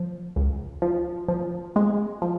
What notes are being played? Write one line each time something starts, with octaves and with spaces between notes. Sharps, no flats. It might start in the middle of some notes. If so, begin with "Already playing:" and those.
Already playing: F3
C#2
F3
F3
G#3
F3